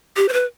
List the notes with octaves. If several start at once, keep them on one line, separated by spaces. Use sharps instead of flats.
G4
C5
B4